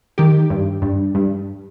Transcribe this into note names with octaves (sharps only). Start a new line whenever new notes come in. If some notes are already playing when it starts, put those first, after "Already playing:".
D#3 G4
G2
G2
G2